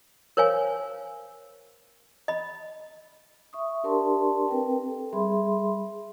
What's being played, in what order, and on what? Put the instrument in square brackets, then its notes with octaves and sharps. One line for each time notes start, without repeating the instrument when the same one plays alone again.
[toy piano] A#4 C5 C#5 F5 G#5
D#5 B5
[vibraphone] E5 C#6 D#6
D4 G4 A#4 D5 A5 C6
C4 A#4 B4 G5
A4
G3 G#4 E5 B5 C6